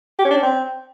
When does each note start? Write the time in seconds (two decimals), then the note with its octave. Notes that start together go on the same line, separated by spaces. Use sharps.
0.19 G4
0.25 C#4
0.31 D4
0.37 C#4
0.42 C4